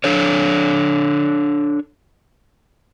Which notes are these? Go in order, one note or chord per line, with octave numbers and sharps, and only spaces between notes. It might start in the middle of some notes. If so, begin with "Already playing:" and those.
D4 A4 C#5